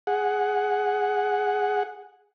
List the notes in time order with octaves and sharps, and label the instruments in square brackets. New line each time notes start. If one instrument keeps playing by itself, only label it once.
[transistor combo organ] G#4 F#5